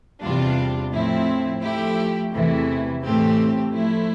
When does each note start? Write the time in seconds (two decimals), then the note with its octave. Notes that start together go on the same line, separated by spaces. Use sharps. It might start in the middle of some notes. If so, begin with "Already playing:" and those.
0.23 E2 C3 G3 D4 F4
0.93 A2 F3 C4 E4
1.63 F3 A3 E4 G4
2.33 E2 C3 E3 A3 E4
3.03 A2 E3 A3 C4 G4
3.73 F3 A3 E4